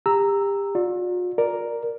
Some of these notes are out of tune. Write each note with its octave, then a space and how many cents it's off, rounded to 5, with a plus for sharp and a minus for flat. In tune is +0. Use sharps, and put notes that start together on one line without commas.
G4 +30 A#5 -5 E6 +0
F4 +45 D5 +0
A#4 +0 D5 +0